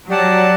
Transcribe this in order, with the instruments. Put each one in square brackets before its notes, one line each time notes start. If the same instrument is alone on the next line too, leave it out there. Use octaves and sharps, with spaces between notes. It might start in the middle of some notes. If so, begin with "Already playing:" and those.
[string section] F#3 [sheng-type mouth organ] G4 D5 F#5 A5